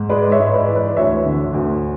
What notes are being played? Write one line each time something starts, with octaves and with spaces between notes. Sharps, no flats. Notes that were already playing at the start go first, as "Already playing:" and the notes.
Already playing: G#2
G#3 B4 D5
C#5 E5
G#2
B4 D5
E3
B4 D5
D2 C#5 E5
D3
D2